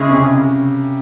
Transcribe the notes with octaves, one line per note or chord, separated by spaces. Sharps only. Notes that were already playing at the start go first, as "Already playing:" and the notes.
Already playing: C#3 G#3 C#4 E4 G#4
C3
C#3
C#3